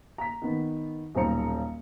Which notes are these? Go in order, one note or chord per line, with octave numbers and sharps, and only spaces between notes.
A#5 B6
D#3 B3
D#1 B1 C5 A#5 C#7